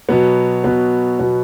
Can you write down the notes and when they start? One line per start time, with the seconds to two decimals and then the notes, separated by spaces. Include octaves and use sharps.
0.09 B2 F#3 B3
0.64 B2 F#3 B3
1.19 B2 F#3 B3